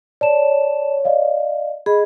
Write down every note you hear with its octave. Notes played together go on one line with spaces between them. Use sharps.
C#5 D5 A5 E7
D5 D#5 F5
G#4 D#5 B5